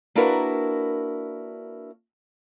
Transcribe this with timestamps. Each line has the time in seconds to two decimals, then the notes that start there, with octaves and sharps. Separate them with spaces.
0.15 A#3 D4 E4 F#4 A#4 B4